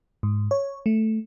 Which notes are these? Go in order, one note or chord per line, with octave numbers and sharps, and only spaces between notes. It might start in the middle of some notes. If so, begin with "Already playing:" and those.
G#2
C#5
A3